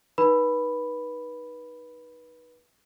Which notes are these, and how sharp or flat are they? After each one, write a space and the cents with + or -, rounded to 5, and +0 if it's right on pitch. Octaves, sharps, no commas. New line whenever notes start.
D#4 +0 B4 -25 B5 +0